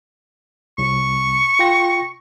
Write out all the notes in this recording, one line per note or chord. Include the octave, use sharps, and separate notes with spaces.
C2 C#6
F4 G5 A#6